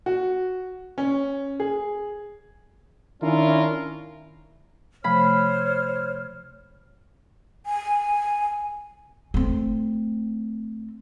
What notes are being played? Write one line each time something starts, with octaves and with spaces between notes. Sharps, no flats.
F#4
C#4
G#4
D#3 C#4 D4 E4 F4 A#4
C3 F3 A3 C5 C#5 B5 F6
G#5
A3 C4